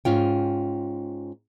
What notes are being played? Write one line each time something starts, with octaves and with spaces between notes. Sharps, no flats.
G#2 C#4 F4 G5